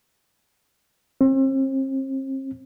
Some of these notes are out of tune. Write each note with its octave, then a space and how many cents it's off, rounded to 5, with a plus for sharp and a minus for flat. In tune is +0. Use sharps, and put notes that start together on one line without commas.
C4 +40